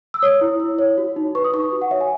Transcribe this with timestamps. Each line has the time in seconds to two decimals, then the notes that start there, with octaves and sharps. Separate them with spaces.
0.14 E6
0.22 C#5 D#6
0.41 E4
0.60 E4
0.79 C#5
0.98 F#4
1.16 D#4
1.35 B4 C#6
1.44 D#6
1.54 D#4 C#6
1.72 F#4
1.82 F#5
1.91 C#5 E5
2.01 G#5